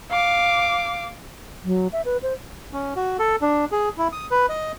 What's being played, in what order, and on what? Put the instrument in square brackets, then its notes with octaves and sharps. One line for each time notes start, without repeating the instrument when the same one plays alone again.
[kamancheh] F5 D6
[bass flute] F#3
E5
B4
C5
[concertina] C#4
F#4
A4
D4
G#4
E4
D#6
B4
D#5